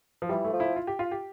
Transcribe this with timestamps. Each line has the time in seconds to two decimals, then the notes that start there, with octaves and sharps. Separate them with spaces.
0.22 F3
0.29 E3 G3
0.45 A3
0.53 F3
0.60 E4
0.76 F4
0.87 G4
0.99 F4
1.11 G4